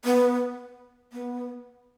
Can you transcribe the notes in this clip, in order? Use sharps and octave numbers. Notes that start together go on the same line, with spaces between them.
B3
B3